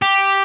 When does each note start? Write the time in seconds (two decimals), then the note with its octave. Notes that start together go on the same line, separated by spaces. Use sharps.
0.02 G4